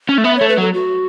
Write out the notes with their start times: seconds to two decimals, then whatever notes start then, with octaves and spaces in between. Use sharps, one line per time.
0.09 C#4
0.18 A3
0.24 B3 E5
0.37 C#5
0.41 A3
0.49 B4
0.57 F#3 A4
0.74 F#4